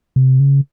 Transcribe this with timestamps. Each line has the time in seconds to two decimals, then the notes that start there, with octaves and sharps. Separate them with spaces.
0.16 C3
0.40 C#3